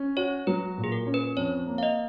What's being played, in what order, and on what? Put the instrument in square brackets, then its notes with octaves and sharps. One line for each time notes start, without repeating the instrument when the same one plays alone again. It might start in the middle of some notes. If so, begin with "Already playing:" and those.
Already playing: [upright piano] C#4
[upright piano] F#4 [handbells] C#5
[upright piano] F#3 [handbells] B4
[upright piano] A#2
[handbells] G#4
A#4
[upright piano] C#4
[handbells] B4
[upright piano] F2 [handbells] C#5
[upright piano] A#3
[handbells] F5
D#5